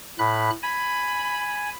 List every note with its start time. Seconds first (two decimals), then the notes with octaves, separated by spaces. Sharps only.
0.19 A2 B5 F#6
0.63 G#5 B5